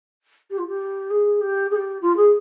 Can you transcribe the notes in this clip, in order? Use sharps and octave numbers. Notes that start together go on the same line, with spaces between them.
G4
F4
G4
G#4
G4
G#4
G4
F4
G#4